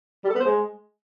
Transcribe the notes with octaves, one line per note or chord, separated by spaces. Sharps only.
G3
A4
B3
C5
G#3